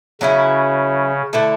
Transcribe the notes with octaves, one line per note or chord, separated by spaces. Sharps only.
C#3 F#3 C#4 E4 B4
D3 A3 E4 A4